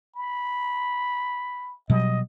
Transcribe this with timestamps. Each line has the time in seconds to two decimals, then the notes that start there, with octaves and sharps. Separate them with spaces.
0.16 B5
1.90 B2 F#3 G3 D#5